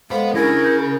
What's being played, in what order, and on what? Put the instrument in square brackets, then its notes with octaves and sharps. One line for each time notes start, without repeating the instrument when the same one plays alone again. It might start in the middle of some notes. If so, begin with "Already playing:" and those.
[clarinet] G#3 [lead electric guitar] B3 B5 [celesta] A4 C5 [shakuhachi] F5
[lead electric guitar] C#4 G#4 [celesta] D4 A#6 [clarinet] E4 [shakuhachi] A#4
[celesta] G6